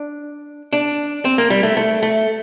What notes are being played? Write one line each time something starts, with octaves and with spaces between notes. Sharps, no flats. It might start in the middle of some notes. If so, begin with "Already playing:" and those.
Already playing: D4
D4
C4
A#3
G3
A3
A3
A3